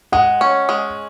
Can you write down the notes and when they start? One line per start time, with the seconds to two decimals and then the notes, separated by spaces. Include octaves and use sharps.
0.12 G#3 F#5
0.41 C#4
0.69 G#3